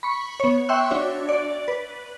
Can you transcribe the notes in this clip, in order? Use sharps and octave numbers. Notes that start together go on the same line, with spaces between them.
B5 C#6
B3 C#5
E5 G5 C6 C#6 E6 F#6
D4 F#4 C#5
D5
B4